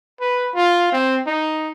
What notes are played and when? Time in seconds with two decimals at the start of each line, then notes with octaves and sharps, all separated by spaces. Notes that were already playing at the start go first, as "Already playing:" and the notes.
0.21 B4
0.54 F4
0.92 C4
1.27 D#4